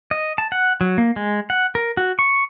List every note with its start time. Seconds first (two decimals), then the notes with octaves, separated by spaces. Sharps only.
0.11 D#5
0.38 A5
0.52 F#5
0.81 F#3
0.98 A#3
1.16 G#3
1.50 F#5
1.75 A#4
1.97 F#4
2.19 C#6